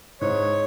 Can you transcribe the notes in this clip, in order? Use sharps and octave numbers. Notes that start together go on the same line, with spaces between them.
G#2 C#5